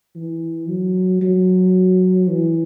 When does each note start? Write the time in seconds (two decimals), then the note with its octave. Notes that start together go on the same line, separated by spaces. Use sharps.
0.16 E3
0.68 F#3
1.21 F#3
2.28 E3